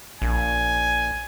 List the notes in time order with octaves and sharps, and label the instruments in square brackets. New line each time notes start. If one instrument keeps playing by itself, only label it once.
[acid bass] A#1 [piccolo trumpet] G#5